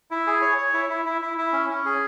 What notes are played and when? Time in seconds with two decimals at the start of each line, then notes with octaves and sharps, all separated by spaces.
0.11 E4
0.27 G#4
0.42 C#5
0.58 C#5
0.74 E4
0.90 E4
1.05 E4
1.22 E4
1.38 E4
1.53 C#4
1.70 C#4
1.85 G#4